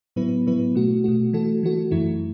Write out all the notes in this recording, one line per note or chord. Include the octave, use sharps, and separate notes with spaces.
A2 F#3 B3 E4 B4
A2 F#3 B3 E4 B4
B2 A3 F#4
B2 A3 F#4
E3 A3 F#4 A4
E3 A3 F#4 A4
F#2 E3 A3 E4